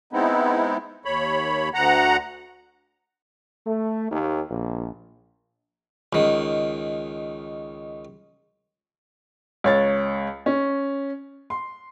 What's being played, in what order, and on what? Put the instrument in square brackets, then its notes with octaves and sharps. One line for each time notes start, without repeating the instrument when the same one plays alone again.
[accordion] G#3 B3 C4 D#4 E4
D#2 C#5 B5
D2 F#5 A#5
[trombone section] A3
D#2
A#1
[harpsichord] C#2 D#3
[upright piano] C#2 C#5 A6
C#4
C6